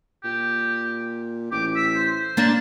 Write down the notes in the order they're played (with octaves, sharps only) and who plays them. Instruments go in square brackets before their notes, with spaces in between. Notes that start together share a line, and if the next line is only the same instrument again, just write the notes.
[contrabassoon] A#2 [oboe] G4
[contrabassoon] A1 [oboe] G4 [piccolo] D6
[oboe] E6 [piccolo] B6
[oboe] C5
[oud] A#3 D4 [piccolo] A6